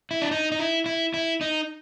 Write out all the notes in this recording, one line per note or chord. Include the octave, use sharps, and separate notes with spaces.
E4
D4
D#4
D#4
E4
E4
E4
D#4